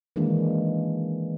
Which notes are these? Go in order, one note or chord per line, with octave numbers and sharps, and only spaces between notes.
D#3 E3 G#3 A#3 D4 F4